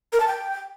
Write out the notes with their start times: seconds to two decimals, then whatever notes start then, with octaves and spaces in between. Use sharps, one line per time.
0.13 A#4
0.20 A5
0.27 G5